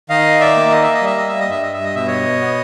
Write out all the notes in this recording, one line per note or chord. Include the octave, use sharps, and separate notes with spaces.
D#3 D#5 F5
D5 E5
A#3
D#5
E5
D#5
G3 E5
D#5
E5
D#5
G2 E5
D#5
E5
D#5
B2 E5
C#5 D#5
B3